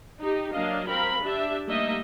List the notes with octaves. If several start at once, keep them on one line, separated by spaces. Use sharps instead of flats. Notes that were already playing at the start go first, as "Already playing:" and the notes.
D#4 G4
F#3 A#3 D4 D#5 F5
C4 A#4 F5 B5
D4 G4 E5
G3 A3 A#3 D#4 D#5 E5